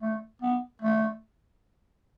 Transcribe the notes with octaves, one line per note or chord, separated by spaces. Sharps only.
A3
B3
A3